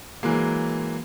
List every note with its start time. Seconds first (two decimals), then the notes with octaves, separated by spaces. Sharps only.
0.23 E3 F#3 G#3 A#3